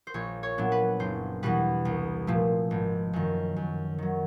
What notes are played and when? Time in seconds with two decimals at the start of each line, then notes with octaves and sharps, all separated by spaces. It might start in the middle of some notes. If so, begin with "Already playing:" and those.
0.07 C5
0.14 A#1 C#5
0.43 C#5
0.58 A#2 F#3 B3 D4
0.72 B4
1.00 F#1 C5
1.43 E2 B2 G3 B4
1.85 C2
2.27 A#2 F3 A3
2.71 G#1
3.13 F#2 D#3
3.56 F#2
3.98 D#3 F#3